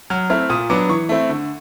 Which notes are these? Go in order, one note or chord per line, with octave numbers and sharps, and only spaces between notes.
F#3 F6
A3 C4 E4 F6
A#2 D#6
F#3 B3 D4 D6
E3 C#6
A3 C4 E4
D3